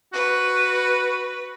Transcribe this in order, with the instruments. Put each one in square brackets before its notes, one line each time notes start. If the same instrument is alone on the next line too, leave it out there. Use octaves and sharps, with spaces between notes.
[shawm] F#4 [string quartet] B4